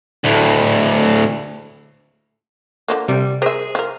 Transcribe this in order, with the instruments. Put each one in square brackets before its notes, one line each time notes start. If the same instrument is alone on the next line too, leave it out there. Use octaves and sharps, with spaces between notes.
[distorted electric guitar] D2 A2
[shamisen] D3 F3 A#3
[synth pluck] C3 [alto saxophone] G3
[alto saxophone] G#4 [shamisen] A#4 E5 [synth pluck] C5
[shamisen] F3 A#4